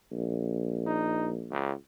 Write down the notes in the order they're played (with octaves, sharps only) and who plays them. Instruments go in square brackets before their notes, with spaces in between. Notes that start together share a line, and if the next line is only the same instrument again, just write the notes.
[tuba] A#1
[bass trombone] D#4
C#2